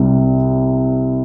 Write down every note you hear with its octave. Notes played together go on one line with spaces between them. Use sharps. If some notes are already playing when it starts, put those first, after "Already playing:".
Already playing: C2 C3 G3